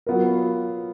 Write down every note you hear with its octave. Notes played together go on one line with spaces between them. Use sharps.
F#3 B3 F4 A#4